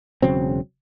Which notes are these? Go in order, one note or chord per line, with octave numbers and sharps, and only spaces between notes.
E1 C#3 F#3 C4